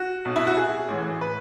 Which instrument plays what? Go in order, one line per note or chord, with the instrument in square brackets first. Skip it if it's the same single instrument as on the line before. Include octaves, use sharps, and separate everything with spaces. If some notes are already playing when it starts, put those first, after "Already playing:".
Already playing: [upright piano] F#4
B1 B2
E4
F#4
G#4
A1 A2 E3
B4